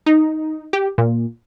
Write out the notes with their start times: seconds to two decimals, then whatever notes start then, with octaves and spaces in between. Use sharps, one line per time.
0.06 D#4
0.73 G4
0.98 A#2